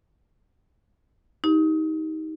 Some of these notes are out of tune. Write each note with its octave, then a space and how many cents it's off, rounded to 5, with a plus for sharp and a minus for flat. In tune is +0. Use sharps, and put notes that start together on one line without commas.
D#4 +25 G4 +0